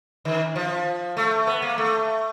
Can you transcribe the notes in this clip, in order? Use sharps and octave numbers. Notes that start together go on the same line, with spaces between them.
D#3
F3
A3
B3
A#3
A3